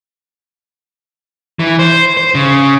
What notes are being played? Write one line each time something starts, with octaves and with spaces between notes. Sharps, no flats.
E3
C5
C5
C#3